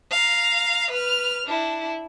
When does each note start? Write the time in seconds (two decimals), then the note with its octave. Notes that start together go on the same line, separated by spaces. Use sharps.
0.11 F5 A#5
0.90 B4 F6
1.46 D4 E4